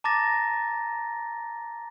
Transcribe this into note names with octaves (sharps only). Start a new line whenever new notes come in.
A5 A#5 D6 A6 A#6